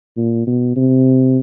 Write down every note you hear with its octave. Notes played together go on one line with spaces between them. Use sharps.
A#2
B2
C3